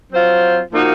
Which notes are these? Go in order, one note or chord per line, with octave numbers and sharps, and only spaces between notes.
F#3 C4 F4 C5
A#2 F3 A#3 D#4 F#4